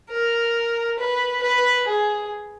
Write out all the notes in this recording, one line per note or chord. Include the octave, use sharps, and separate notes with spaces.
A#4
B4
B4
G#4